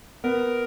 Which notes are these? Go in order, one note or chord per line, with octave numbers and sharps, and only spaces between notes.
B3 A#4